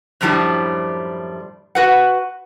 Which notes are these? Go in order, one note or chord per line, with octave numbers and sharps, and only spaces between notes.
F#2 A2 F3 G3 D4 E4
F#4 B4 F#5